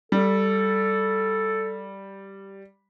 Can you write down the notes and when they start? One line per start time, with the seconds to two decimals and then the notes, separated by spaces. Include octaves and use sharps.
0.12 G3 A4